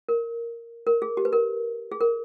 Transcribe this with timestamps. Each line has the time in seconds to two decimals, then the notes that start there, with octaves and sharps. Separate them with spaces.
0.09 A#4
0.87 A#4
1.02 G#4
1.17 G4
1.25 B4
1.33 A#4
1.92 G#4
2.01 A#4